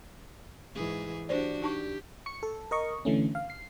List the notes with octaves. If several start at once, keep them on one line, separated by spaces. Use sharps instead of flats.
G#2 E3 G#4
D4 F#4 G4 C5 D5
D#4 G4 A5 C#6
C#6 C#7
A4
A#4 D#5 C#6
D3 E3 A3 C#4
F5
C7